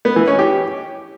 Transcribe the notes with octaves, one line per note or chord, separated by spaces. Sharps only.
B3
E3
C#4
G4